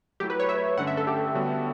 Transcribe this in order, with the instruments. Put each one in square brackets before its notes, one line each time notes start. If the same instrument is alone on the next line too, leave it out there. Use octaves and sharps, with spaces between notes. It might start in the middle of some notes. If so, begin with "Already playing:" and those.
[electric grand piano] F#3 A3 E4 [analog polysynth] G4
[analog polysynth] B4
C#5
E5
[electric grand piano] G2 D3 A3 C#4 [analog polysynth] F#5
[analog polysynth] E5
A4
G4
[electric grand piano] D3 G3 B3 F#4 C#5